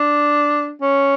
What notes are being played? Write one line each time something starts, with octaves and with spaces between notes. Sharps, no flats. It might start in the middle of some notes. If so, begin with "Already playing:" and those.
Already playing: D4
C#4